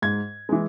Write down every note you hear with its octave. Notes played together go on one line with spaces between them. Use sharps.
G#2 G#6
E3 G#3